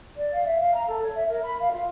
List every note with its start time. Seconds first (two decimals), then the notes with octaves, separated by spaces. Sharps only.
0.16 D5
0.33 F5
0.45 E5
0.59 F5
0.74 A#5
0.87 A4
1.02 C#5
1.15 E5
1.29 A#4
1.43 B5
1.60 F5
1.71 F4